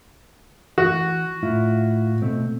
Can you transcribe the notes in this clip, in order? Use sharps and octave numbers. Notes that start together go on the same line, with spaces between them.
E3 F#4
A2 E4 F4
B2 A3 C4